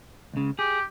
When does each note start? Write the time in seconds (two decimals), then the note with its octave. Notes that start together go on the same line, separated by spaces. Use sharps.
0.34 C#2 C#3
0.59 G4 G#4